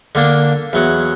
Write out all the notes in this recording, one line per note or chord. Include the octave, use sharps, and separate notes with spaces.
D3 A#3 D4
E2 F#3 F#5